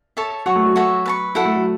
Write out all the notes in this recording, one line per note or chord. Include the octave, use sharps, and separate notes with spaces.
A4 C#5 E5 A5
F#3 C#5 F#5 C#6
A3
F#3
F#4 A4 C#5 E5
B4 A5 C#6
F#3 E4 A4 F#5
A3
F#3